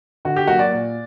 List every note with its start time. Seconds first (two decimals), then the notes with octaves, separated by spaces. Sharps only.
0.25 D3 F#4
0.36 G4
0.48 F#3 A#3 F#4
0.59 D5
0.71 A#2